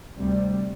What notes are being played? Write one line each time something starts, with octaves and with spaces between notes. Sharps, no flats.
D2 C3 G3